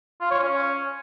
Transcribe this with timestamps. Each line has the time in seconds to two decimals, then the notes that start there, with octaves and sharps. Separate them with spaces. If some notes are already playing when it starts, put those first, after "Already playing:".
0.21 F4
0.31 C#5
0.40 C#4